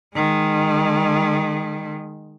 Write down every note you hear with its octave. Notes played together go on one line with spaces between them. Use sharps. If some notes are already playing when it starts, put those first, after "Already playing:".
D#3 G#3